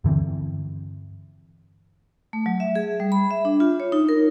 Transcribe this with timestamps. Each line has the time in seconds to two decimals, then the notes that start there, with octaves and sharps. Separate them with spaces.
0.04 G2 D3 E3 C4
2.33 A3
2.46 F#3
2.60 E5
2.75 G#4
3.00 G3
3.12 B5
3.31 E5
3.45 D4
3.60 F4
3.80 C#5
3.92 D#4
4.09 A#4